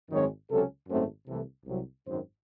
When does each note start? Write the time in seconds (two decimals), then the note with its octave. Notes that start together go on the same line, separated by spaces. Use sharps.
0.11 G#1 F#2 D#3 G#3 C4 C#5
0.49 C#2 C3 F#3 C#4 A4
0.88 G#1 F#2 D#3 A3 C4 C5
1.27 C2 C3 E3 A3 A4
1.65 C2 C3 F#3
2.04 G#1 F#2 D#3 C5